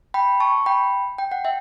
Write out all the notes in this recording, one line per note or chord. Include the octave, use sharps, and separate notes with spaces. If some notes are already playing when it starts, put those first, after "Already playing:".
G5 B5
A5 C#6
G5 B5
G5
F#5
E5 G5